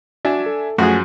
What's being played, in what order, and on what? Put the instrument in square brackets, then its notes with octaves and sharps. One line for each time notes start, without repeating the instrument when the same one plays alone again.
[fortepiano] D4 [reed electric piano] F#4 [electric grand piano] E5 G#5
[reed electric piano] A4
[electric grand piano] F#2 F3 [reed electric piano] A3 [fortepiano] F#4 G#4